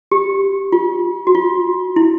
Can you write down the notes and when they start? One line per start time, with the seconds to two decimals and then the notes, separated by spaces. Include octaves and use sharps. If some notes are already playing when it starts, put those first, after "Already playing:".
0.12 G4
0.72 F4
1.27 F#4
1.35 F4
1.96 E4